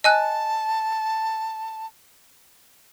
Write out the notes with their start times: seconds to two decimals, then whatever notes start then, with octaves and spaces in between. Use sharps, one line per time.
0.04 D#5 G#5 A5 F#6